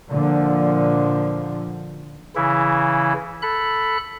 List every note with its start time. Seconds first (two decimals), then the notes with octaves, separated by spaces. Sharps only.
0.10 A#2 D3 F3
2.35 C#3 E3 E4
3.42 A4 B5 F#6